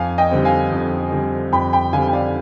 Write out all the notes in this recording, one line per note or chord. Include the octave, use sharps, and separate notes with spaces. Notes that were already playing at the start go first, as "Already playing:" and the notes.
Already playing: F2 F5 G#5
D#5 G5
D3 G3 C4
F5 G#5
F2
D3 G3 C4
F2 G5 B5
G5 B5
D3 G3 C4 F5 G#5
G5
D5 F5